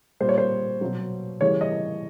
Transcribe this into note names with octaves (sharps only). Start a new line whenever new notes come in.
A#2 G3 C5
C#5
C5
B2 F#3
C#3 E3 G3 C#5
D#5